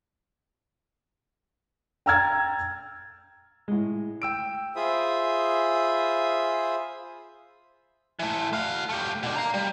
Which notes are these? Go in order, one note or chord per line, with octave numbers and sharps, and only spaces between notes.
G5 A#5 E6 F6 G#6 A6
A2 G#3
G5 E6 D7
F4 G#4 C5 E5 B5 D#6
E3 A3
F#4 F5
A3 G4
B2 D4
F5 A#5
G3